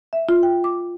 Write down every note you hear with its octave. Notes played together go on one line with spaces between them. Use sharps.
E5
F4
G5
D6